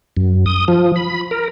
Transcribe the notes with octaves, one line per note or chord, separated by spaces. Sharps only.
F#2
D#6
F3
B5
A#4